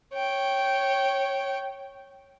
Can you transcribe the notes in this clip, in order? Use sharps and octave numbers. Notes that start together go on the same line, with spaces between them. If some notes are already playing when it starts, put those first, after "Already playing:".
C#5 G5